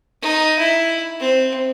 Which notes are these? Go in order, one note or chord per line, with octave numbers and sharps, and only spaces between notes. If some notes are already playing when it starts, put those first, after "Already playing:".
D#4
E4
C4